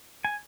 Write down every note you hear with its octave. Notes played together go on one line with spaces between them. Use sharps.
G#5